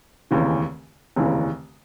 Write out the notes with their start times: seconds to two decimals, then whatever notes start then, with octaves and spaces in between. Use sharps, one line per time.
0.31 F1 D#2 C#3 E3
1.16 F1 D#2 C#3 E3